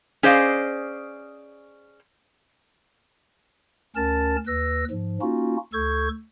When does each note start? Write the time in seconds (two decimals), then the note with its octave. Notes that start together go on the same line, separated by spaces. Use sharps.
0.23 C#4 G#4 C5 D5 D#5 F5
3.96 D2 C#4 A#4 A5 A6
4.47 D#2 B4 E6 A#6
4.91 G#2 F3
5.21 A#3 C#4 D#4 F4 F#4
5.73 D2 A4 C#6 G6 G#6